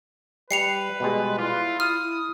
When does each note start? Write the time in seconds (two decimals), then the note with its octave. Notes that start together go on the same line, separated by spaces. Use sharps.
0.51 G3 B4 C7 C#7 F7
1.00 B2 G3 G#3
1.38 E4 F4 D5
1.80 D#6 F6